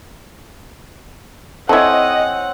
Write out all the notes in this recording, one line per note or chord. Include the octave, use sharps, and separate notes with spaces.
C4 E4 A4 C#5 D#5 F#5 G#5